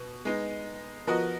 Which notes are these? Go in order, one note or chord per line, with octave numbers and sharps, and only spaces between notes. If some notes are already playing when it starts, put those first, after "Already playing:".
Already playing: B2
G#3 B3 D#4
F3 B3 F#4 A#4 D#5